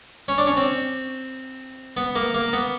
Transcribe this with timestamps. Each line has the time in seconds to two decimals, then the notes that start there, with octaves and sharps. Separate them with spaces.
0.28 C#4
0.38 D4
0.47 C#4
0.57 C4
1.97 B3
2.15 A#3
2.34 A#3
2.53 B3